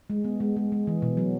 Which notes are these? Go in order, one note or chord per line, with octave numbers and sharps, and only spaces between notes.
G#3
B3
G#3
G#3
G#3
E3
B2
F#3